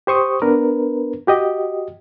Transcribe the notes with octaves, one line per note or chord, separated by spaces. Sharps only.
G4 C5 C#6 D#6
B3 D4 A#4 B4
F#4 G4 D#5